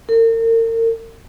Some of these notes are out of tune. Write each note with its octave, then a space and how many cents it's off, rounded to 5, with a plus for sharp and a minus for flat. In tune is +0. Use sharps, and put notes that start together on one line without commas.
A#4 -40